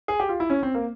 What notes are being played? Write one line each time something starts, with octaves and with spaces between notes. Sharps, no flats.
G#4
G4
F4
E4
C#4
C4
A#3